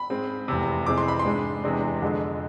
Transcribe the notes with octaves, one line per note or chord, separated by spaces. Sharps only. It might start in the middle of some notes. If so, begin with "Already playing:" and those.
Already playing: B5
G#2 G#3 C4
F1 E2 C3
F2 C3 E3 G#3 C4 D6
C6
B5
C6
G#2 G#3 D4
E2 C3 G#3 D4
F2 D3 G#3